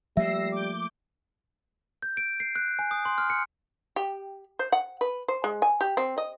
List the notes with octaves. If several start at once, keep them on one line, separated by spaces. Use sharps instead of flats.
F3 G3 A3 A#3 E5 E6 A#6 C7
D6 G6
G6
D7
C7
F#6
G#5
D#6
C6
F6
C#7
G4
C5
F#5
B4
C5
G#3
G#5
G4
C4
D#5